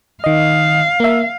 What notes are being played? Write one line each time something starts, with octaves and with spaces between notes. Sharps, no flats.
D#3 D#5 F5
A#3 E5